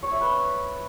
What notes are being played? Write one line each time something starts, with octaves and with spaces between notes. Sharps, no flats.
C#5
E5
B4